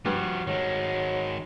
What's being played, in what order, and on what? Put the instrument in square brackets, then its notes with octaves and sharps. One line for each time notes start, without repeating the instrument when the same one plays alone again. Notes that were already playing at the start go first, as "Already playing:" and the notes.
[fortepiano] G2 [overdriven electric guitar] F3 F#4
[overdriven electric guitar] D#3 G#3 [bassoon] F#3